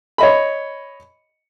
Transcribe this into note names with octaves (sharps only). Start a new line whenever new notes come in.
C#5 D#5 B5